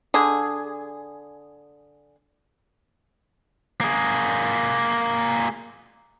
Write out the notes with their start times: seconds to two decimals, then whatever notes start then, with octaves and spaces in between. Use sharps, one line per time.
0.14 D3 G#4
3.81 A#3 G#4